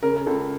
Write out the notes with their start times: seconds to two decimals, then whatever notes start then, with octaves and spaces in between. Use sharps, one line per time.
0.03 C#3 A#4
0.16 A#4
0.26 C#2 A4